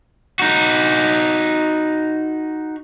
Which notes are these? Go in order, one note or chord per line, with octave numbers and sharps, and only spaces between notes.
D#4 F#4